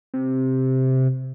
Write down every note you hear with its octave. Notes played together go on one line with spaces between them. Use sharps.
C3